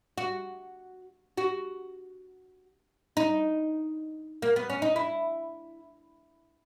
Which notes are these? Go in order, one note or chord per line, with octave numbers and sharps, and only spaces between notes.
F#4
F#4
D#4
A#3
B3
C#4
D#4
E4